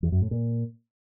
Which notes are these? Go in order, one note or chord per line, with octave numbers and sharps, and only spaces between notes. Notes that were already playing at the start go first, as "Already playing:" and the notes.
E2
F#2
A2
A#2